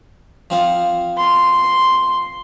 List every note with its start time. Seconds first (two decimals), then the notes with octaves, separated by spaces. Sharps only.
0.50 F3 C4 F5
1.17 C6